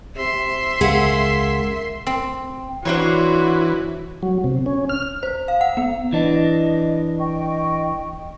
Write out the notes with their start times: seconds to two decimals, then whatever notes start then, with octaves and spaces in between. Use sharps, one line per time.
0.17 C3 E5 C6
0.81 C#2 G#4 A#4 F5 F#5
2.07 C4
2.85 E3 D4 F#4 C5 C#5
4.23 F#3
4.44 C3
4.66 C#4
4.89 F6
5.23 C5
5.48 F5
5.61 F#5
5.77 B3
6.13 E3 D4 D#5
7.19 D#5 G5 C#6